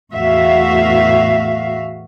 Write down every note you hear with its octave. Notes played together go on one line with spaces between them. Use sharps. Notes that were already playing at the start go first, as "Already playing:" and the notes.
E2 A2 F#4 E5 F5